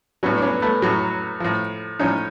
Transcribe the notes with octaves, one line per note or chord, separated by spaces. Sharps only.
A2 F#3 B3 C#4
D4
B3 C#4
A3 B3
A2 F#3
A2 F3
A2 F3 C#4 D#4